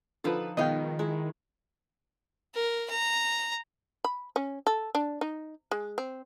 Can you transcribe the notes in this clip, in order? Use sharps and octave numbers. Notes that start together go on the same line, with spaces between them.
D3 F3 D#4 B4 A5
B2 D#3 G#3 B4 D#5 F5 G5
G#3 E4
A#4
A#5
B5
C#4
A4
D4
D#4
G#3
C4